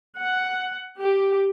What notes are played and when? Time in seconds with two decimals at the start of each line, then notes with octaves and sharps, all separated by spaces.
0.19 F#5
0.99 G4